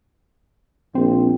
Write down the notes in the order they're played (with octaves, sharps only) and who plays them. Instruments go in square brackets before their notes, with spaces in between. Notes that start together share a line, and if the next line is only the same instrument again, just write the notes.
[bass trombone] A#1 [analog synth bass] C4